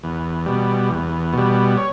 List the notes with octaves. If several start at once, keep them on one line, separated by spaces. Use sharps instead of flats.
E2
B2 G3
E2
B2 G3
C#5